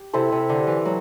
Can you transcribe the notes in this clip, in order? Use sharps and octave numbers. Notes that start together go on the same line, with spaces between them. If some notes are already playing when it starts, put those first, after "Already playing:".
Already playing: G4
C3 E4 A4 C5
C3
D3
E3
F#3